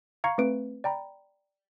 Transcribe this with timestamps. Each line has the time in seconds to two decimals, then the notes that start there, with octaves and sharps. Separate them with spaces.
0.24 F5 A#5 C#6 G#6 C#7
0.38 A3 C4 B4 D7
0.84 D5 G5 A#5 B5